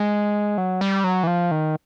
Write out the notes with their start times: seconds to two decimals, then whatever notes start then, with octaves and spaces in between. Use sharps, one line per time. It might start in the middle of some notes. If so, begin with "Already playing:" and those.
Already playing: G#3
0.58 F#3
0.81 G3
1.04 F#3
1.23 E3
1.27 F3
1.51 D#3